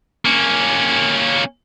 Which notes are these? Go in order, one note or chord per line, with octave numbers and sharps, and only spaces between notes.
A#3 C#4